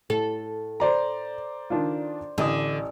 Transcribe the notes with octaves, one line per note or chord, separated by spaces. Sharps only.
A2 A4
C5 D5 A#5
D#3 D4 F4
A1 D3 D#5 D#6